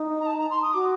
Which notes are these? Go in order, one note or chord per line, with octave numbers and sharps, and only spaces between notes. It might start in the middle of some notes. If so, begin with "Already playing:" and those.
Already playing: D#4
A#5
A5
A#5
C6
D#6
F#4 D6